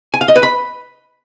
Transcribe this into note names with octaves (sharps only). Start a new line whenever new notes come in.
G#5
F5
D#5
B4
B5